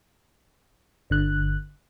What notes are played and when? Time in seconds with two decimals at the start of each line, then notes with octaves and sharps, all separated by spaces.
1.10 G1 D3 F#6